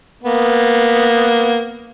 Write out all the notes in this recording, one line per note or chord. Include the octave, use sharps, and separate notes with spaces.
A#3 B3